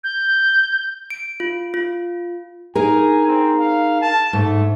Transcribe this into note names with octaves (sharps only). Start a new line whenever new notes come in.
G6
D7
F4
F4
D#4 G#4 A#4 G#5
C4
F5
A5
G#2 A3